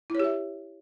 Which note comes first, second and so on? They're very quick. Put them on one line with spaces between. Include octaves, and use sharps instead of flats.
E4 C#5 G4 E5